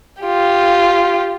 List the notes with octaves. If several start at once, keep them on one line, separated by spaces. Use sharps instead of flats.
F4 G4